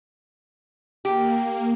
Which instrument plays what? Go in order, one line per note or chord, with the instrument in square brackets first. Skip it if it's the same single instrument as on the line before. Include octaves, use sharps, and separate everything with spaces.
[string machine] A#3 [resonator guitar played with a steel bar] G4